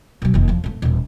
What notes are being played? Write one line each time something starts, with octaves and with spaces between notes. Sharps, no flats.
B2 F#3
F1 D#2
E2 F3
G#1 A3
D#1 E2